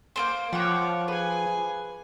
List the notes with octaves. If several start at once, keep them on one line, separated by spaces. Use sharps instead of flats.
A#3 C4 C5
F3 C#5 F#5 G5 D6
G#4 B4 G#5